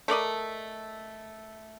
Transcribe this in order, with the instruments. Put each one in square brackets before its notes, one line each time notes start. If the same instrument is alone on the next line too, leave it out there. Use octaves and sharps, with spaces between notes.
[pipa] A3 A#4 D5 D#5